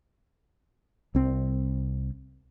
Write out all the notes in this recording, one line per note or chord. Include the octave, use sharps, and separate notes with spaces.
C2 C4